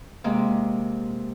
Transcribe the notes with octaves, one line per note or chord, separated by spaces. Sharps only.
C3 G#3 A#3